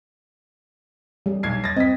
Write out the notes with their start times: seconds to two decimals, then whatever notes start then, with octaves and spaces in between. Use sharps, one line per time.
1.26 G3 G#4
1.43 B1 G#6 C7
1.64 A6 A#6
1.76 C4 D#5 B6